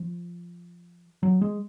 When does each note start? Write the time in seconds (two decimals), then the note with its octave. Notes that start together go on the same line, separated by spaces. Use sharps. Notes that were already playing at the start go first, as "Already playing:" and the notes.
Already playing: F3
1.23 F#3
1.41 G#3